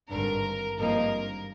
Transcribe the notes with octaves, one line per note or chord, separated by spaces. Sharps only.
G#1 G2 D3 A#4
G#1 G2 F3 A#3 D#4 A#4